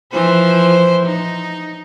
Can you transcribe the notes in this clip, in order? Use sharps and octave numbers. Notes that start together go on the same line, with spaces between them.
E3 F3 C5
D#4